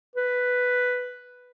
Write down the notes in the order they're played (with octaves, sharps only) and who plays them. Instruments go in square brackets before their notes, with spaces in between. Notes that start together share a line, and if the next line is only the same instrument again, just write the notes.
[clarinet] B4